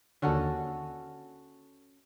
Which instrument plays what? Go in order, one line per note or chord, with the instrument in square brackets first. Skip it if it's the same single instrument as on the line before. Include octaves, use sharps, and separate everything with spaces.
[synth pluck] D#2 D3 [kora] C#4 F#4 A4